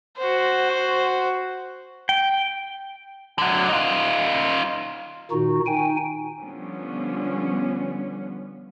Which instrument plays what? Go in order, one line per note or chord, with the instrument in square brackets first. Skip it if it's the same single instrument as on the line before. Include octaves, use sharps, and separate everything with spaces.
[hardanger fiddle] F#4 C5
[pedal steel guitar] G5
[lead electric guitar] D3 F#3
D#4 F4
[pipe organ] A#2 D#3 D#4 F#4
D#4 G5 G#5
[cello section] D3 F3 G3 B3 C#4